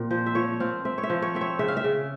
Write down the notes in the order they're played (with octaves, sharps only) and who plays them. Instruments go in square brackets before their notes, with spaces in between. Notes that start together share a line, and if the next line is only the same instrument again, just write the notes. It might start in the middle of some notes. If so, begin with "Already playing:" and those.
Already playing: [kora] A#2 C4
F3 C5
E5
F3 C#5
C4 F5
C4 E5
C#5
E5
F3
C#5
C4 E5
C#5
C#3 E5
F5
E5
C#3